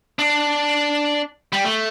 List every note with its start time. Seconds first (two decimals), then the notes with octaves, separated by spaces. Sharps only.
0.19 D4
1.53 G3
1.64 A3